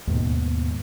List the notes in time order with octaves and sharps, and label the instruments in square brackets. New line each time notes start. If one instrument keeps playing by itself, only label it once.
[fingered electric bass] D#2 G#2 B2